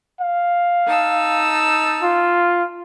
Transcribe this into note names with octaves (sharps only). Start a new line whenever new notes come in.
F5
D#4 A5 E6
F4